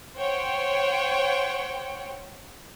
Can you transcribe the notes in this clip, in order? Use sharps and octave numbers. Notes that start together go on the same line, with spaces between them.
C5 C#5 F#5 G5